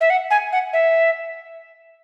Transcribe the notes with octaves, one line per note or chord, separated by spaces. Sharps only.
E5
F#5
G#5
F#5
E5